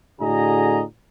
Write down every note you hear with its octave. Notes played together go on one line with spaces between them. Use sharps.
A2 D3 F#4 G#4 D#5 A#5